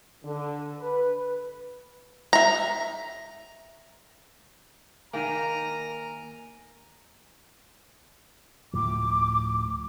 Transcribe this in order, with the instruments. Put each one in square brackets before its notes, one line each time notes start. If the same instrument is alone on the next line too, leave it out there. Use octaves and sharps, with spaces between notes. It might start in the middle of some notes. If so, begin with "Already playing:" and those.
[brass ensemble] D3
B4
[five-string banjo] E5 A#5
[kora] D#3 A#3 [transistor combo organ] A#4 [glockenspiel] G#5 D#7 [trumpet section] A#5
[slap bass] D2 A2 F3 [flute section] D6